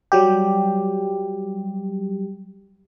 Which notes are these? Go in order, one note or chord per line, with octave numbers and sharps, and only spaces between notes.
F#3 G3 G4